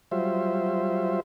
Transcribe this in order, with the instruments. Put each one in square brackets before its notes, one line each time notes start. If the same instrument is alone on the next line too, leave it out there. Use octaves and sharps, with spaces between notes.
[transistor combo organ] F#3 G3 F4 C5 E5